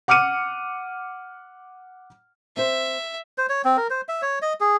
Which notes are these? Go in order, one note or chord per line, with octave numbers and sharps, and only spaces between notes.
F#5 D6 F6 C#7 D#7
C4 C5 E5
C5
C#5
C4
A#4
C5
E5
C#5
D#5
G#4